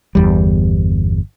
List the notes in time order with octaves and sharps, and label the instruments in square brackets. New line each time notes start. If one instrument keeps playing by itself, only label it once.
[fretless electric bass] G1 E2 G3